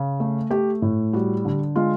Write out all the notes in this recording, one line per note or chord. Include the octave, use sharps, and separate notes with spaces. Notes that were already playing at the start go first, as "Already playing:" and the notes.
Already playing: C#3
A3
A3 G4
A2
G3 F#4
D3
G#3 F4